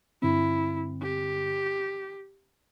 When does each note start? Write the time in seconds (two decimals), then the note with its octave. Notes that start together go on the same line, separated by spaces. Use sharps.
0.22 G2 D3 C4 E4
1.02 G4